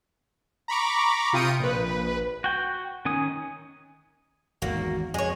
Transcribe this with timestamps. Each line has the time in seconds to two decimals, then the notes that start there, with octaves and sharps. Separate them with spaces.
0.68 A#5 B5 C#6 D6
1.33 C3 F4 G5 D#6 C#7 D#7
1.60 A#1 B4
2.44 F#4 G5
3.05 D#3 C#4 G#5 D#6
4.62 G#1 E2 D#3 A#3 F#4
5.14 F2 F3 G#3 C#5